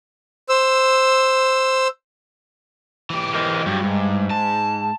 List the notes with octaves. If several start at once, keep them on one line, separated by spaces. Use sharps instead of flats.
C5 E6
E3 G4
A#4 C5 D#5
G2 F#3 F#4 G4
G#2
A5